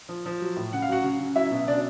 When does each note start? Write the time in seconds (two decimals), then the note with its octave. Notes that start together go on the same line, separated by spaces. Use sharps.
0.09 F3
0.26 F3
0.41 F#3
0.57 A2
0.73 C#3 F#5
0.82 F5
0.88 F#3 F#4 F#5
1.04 C#3
1.19 C#3
1.36 F#3 E4 E5
1.51 B2
1.67 C#3 D4 D5